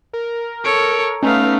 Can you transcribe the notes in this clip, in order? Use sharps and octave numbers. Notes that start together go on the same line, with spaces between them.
A#4
A4 C#5 D7
A3 B3 C#4 D#4 F5